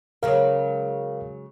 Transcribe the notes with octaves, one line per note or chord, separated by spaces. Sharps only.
C#3 F#3 G#3 A#4 F5